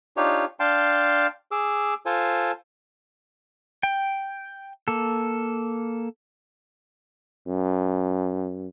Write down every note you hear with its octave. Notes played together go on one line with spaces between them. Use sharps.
D4 D#4 F4 G4 C#5
D4 F5 G5 A5 C6
G#4 D6 E6
F4 A4 C5 G#5
G5
A#3 A4
F#2